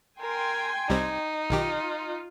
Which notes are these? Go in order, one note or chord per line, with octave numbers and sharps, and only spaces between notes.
A#4 G5 G#5 C6
C2 G3 C4 D#4
B1 D#3 F4 G4